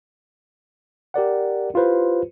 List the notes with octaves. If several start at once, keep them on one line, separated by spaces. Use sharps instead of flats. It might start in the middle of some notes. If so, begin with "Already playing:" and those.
G4 A#4 D5 F#5
E4 F4 G4 B4 C5